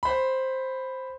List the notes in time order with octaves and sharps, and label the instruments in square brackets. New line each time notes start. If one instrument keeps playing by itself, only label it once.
[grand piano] C5 B5